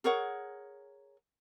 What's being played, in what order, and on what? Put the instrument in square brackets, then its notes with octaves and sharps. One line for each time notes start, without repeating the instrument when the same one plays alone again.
[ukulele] G#4 A#4 C#5 F#5